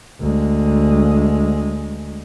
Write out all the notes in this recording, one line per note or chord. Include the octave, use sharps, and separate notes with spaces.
D2 G#3